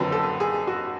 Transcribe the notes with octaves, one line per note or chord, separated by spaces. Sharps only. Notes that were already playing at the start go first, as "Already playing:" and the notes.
Already playing: F#1 F2 D3 F#3 B4
A4
G#4
F#4